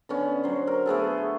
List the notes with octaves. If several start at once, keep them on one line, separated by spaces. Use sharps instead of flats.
D3 B3 C#4
F#3 C5
A#4
A3 B3 G#4 A4